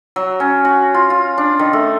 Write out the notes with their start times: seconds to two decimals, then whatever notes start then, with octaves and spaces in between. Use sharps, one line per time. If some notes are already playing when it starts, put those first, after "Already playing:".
0.16 F#3
0.40 C#4
0.65 F#4
0.94 F4
1.10 F4
1.38 D4
1.59 D#3
1.73 A3